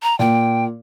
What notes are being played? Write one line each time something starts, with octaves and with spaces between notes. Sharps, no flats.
A#5
A#2 G5